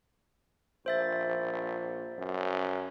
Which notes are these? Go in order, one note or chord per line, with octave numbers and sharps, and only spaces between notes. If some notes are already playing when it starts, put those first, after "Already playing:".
A#1 C5 E5 A6
F#2